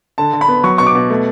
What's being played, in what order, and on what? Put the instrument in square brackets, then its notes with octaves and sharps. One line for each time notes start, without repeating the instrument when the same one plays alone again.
[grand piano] D3 A5
D3
B5
B3
F#3 C#6
B2 C#6
D6
B2
A3